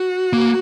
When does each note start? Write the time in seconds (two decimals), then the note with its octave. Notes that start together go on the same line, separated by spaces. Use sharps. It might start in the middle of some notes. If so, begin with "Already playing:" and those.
Already playing: F#4
0.33 A#3